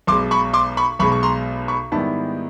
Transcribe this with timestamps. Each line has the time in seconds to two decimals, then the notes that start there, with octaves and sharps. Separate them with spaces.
0.07 B1 B2 G#3 C6 D6
0.31 B5 C#6
0.53 C6 D6
0.77 B5 C#6
0.99 B1 B2 G#3 B5 C#6
1.12 C#6
1.23 A#5 C6
1.68 B5 C#6
1.92 G#2 D#3 G3 B3 E4 A5 B5